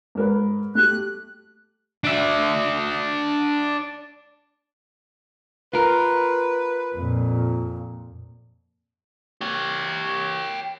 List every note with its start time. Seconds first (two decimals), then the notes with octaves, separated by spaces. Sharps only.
0.15 G#2 A#4 B4
0.75 A3 G4 F#6
2.04 D4 E5
5.73 F4 A#4 B4
6.96 F2 A#2
9.41 G4 C#5